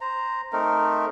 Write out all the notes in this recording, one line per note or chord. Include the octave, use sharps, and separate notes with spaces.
C5 A#5
A3 C4 D#4 A#4